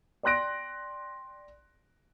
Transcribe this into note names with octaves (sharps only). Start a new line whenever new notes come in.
D5 G5 C6 F#6 A#6 D7